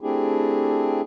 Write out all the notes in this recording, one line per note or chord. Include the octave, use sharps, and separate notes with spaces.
A3 C4 D4 E4 G4 G#4